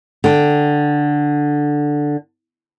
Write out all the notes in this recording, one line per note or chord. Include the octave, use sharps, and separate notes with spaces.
D3 G5